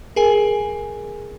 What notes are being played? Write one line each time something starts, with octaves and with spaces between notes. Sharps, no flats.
G#4 A#4 G#5